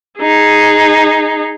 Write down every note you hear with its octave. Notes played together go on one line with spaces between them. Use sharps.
D#4 G#4